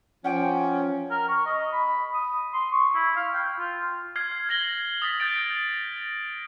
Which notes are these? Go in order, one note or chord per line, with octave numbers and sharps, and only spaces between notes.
F3 C#4 F#5 G5 D6
A#4
C#6
D#5
B5
D#6
C6
C#6
E4
F5
G5
F4
F6 G#6 C7
G#6 A#6 F#7 G7
D#6 A6 B6
G6 A6 D7